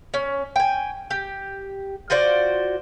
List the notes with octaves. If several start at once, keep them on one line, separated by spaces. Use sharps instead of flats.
C#4
G5 G#5
G4
F4 F#4 C5 D5